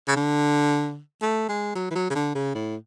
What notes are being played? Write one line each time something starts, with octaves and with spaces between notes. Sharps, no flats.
C#3
D3
A3
G#3
F#3
E3
F#3
C#3
D3
C#3
A2